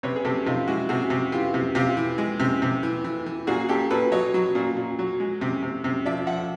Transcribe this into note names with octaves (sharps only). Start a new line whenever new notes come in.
C3 B4 C#5
G#4
C3 G4 A4
C3 D#4 F4
G#3 E4 F#4
C3 F#4 G#4
C3
E3 F4 G4
C3
C3 F4 G4
E3
G#3
C3
C3
E3
E3
E3
A#2 F#4 G#4
A#2 G4 A4
A#2 A4 B4
F#3 C#5 D#5
F#3
A#2
A#2
F#3
G#3
C3
C3
C3
F3 D5 E5
F3 E5 F#5